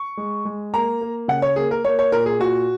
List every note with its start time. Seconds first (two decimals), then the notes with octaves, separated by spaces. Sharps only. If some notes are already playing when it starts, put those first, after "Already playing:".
Already playing: C#6
0.17 G#3
0.45 G#3
0.74 A#3 A#5
1.01 A#3
1.28 C#3 F#5
1.42 C#5
1.56 A#3 G#4
1.71 A#4
1.85 A#3 C#5
1.99 C#5
2.12 A#2 A#4
2.26 G#4
2.39 A#2 F#4